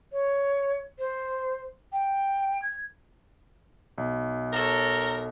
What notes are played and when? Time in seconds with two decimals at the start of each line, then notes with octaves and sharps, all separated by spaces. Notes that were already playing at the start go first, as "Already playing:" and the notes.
0.12 C#5
0.98 C5
1.92 G5
2.62 G#6
3.98 B1
4.53 A4 A#4 C#5